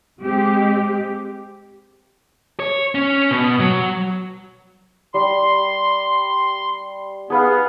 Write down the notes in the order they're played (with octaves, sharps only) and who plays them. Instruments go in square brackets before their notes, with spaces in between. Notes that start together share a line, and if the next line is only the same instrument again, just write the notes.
[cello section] G#3 C4 G4
[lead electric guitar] C#5
C#4
B2
F#3
[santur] G3 [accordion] C6
[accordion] B3 [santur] G#4 B4 F5